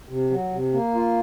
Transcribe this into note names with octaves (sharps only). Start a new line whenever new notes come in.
C3
F#3
C3
A#3
F4